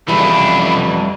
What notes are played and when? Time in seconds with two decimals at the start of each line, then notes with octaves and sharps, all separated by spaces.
0.08 F2 C#3 E3 G3 A3 D4 B5